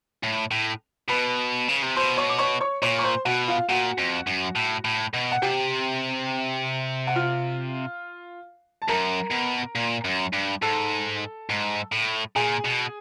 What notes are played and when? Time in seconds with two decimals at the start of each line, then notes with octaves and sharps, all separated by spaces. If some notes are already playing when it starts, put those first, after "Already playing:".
0.23 A2
0.51 A2
1.09 B2 B4 B5
1.68 C#3
1.83 C3
1.96 B2 C5 C6
2.17 C#5 C#6
2.29 D6
2.39 C#5 C#6
2.60 C#5 C#6
2.82 A#2 C#5 C#6
2.99 C#6
3.04 C5 C6
3.25 B2 F#4 F#5
3.48 F4 F5
3.69 A#2 F#4 F#5
3.98 F2
4.27 F#2
4.56 A2
4.85 A2
5.14 B2
5.32 F#5
5.42 C3 G4 G5
7.07 F#5
7.16 F4 F5
8.82 A5
8.88 F#2 A#4 A#5
9.32 B2
9.75 A#2
10.05 F#2
10.33 G2
10.62 G#2 A4 A5
11.49 G#2
11.92 A2
12.36 A#2 G#4 G#5
12.65 B2